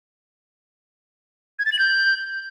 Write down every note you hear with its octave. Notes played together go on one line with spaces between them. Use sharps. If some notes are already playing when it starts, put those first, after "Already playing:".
G#6
A6
F#7
G6